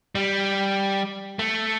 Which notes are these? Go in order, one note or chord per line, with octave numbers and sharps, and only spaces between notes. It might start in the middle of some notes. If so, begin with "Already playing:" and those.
G3
A3